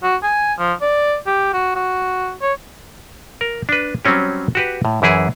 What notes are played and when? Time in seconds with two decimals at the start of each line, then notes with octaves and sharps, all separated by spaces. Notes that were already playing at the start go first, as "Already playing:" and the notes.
0.03 F#4
0.23 G#5
0.59 F3
0.82 D5
1.27 G4
1.53 F#4
1.75 F#4
2.42 C#5
3.41 A#4
3.69 D4 B4
4.05 F#3 G3 C4 C#4 G4
4.55 F#4 G4 B4
4.85 A2
5.02 F#2 E3 E4 G#4